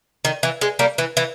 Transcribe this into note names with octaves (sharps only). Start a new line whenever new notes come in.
D#3
E3
G#3
G3 A#3
E3
E3